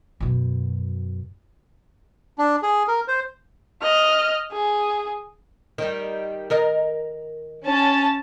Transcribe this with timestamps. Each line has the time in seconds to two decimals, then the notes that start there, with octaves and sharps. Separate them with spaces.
0.20 F#2 B2
2.38 D4
2.63 G#4
2.88 A#4
3.08 C5
3.82 D#5 F6
4.52 G#4
5.78 D#3 G3
6.50 D#3 A#4 D#5
7.65 C#4 A5